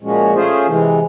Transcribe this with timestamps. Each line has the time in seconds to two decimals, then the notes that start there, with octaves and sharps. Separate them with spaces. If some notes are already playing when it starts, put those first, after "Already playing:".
0.01 A#2 F3 G#3 C#4 F#4
0.33 A3 C#4 F4 G#4 C5
0.67 C3 E3 G#3